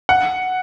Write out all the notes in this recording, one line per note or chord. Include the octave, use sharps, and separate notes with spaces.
F#5